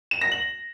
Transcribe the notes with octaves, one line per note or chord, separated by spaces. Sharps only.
E7
A#6
F#7